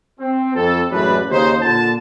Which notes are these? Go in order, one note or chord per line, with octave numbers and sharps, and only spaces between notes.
C4
F2 A4
A1 F#2 G#3 A3 D4 B4
D#2 C#3 D#4 C5
A#2 D3 A5